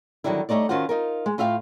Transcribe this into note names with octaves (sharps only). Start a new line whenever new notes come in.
D3 D#3 F#3 G3 D4 E4
G3 A3 D#4 C#5 D5
D#3 C#4 F4 F#4 C5 F#5
D#4 F4 A#4
G#3
A2 F4 E5 F5 G5